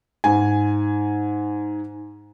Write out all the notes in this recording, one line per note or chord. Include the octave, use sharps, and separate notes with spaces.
G#2 G#5